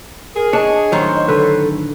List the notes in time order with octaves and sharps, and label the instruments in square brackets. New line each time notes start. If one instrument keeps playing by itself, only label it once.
[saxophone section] G#4 [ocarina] A#4
[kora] D4 [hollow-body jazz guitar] C#5 [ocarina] D#5
[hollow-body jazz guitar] A2 D#3 F#3 [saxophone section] C5 C#5
[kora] D3 B4 [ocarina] A4